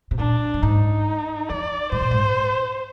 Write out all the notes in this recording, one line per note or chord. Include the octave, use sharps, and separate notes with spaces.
C3
A#2 D4
G2
G#2 D#4
F2 D5
G#2 C5
A#2
G#2